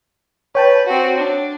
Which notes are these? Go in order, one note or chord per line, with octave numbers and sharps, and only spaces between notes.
B4 C#5 G5 A5
C4 F#4
D4